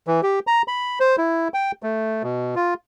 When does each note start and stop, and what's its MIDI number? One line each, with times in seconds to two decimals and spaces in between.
0.07 0.21 52
0.23 0.39 67
0.47 0.62 82
0.68 0.99 83
1.00 1.16 72
1.18 1.48 64
1.54 1.72 79
1.83 2.23 57
2.23 2.55 47
2.56 2.74 65